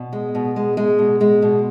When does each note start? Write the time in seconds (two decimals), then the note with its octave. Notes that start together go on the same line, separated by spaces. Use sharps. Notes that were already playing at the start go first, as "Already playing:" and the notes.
Already playing: B2
0.13 G#3
0.35 B2
0.56 G#3
0.77 G#3
0.99 B2
1.21 G#3
1.42 B2